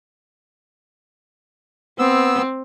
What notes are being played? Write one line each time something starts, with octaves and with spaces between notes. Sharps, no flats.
B3 C4 E6